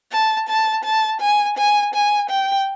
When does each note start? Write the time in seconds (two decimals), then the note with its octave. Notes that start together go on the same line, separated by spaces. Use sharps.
0.12 A5
0.49 A5
0.84 A5
1.21 G#5
1.58 G#5
1.94 G#5
2.30 G5